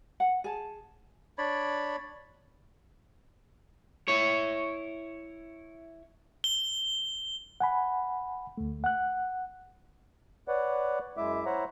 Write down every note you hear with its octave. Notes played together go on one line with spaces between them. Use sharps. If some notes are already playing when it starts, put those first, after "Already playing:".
F#5
G#4 A5
D4 C#5 D5 B5
E4 C#5
G7
F#5 G#5 B5
D2 A3
F#5 F#6
B4 C#5 D5 F#5
F#2 G#3 E4 E5 D6
E4 C5 C#5 E5 F#5 A#5